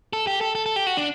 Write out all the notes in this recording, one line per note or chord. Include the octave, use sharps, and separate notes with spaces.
A4
G4
A4
A4
A4
G4
F#4
D4